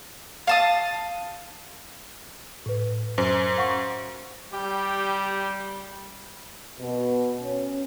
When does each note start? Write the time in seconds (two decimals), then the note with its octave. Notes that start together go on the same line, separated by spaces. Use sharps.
0.47 F5 A5 D#6
2.66 A2 B4
3.18 F#2 C5
3.58 F5 F#5 C#6
4.53 G3 G4
6.80 B2
7.42 C#4